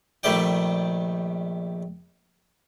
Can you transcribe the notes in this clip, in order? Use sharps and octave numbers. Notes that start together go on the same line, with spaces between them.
A#1 D#3 G3 A3 D5 G5